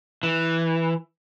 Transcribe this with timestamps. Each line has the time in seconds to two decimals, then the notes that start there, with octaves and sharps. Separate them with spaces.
0.23 E3